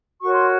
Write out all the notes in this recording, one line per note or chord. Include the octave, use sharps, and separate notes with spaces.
F#4 A#4 C#5 C#6
C6